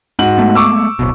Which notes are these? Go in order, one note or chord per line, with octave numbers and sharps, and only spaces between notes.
G#2 F#4 F#7
G#3 A3 B3
C#6 D6 E6
D1 B1 B2